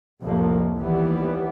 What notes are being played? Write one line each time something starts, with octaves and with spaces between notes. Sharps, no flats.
C2 F2 A2 F3 A#3
D#2 E3 G3 B3